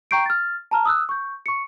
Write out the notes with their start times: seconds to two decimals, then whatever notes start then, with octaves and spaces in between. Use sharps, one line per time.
0.11 G5 A#5 C#6 G6 C7 D7
0.26 F6 A6
0.71 A5 A#5 F6
0.85 D#6 E6 F#6
1.09 C#6 G6
1.46 C#6 C#7